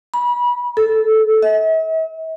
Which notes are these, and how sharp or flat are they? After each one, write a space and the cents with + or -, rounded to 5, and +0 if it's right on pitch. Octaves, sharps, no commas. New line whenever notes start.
B5 -30
A4 -15
E5 -45